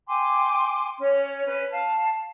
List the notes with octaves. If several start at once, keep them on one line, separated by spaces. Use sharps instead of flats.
G5 G#5 C6 D6
C#4 C#5
C#4 B4
F5 A5